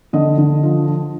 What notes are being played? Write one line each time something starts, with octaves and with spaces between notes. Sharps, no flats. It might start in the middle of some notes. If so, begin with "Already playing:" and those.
D3 D#5
D3
F3
F3